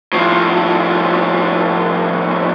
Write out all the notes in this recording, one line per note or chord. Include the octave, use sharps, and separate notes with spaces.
A2 F3